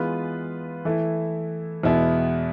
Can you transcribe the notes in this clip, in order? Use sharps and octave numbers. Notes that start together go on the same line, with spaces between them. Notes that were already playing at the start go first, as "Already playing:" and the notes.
Already playing: E3 G#3 B3 F4 B4
E3 A3 E4
E2 B2 G#3 B3 E4